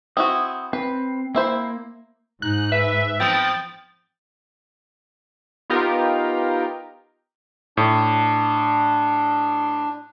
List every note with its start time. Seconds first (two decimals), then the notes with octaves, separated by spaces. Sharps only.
0.17 C4 E4 F#4 D#6
0.73 C4 B4
1.35 A#3 C4 E4 C5
2.42 G#2 D#4 F#6
2.72 B4 E5
3.20 F3 B3 C4 G5 A6
5.70 B3 D#4 F4 G4 A#4
7.77 A2 D4